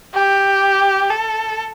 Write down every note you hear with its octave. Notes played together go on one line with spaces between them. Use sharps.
G4
A4